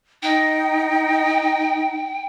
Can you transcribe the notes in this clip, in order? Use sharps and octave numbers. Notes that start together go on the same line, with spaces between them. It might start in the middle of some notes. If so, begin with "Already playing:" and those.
D#4 G5